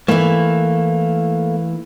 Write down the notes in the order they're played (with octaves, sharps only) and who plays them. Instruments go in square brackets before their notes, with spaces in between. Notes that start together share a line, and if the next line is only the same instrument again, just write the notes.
[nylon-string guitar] E3 E4 [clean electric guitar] A3 A#3